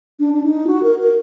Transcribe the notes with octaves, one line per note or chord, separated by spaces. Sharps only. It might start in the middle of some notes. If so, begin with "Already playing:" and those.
D4
D4
D#4
F#4
A#4
A#4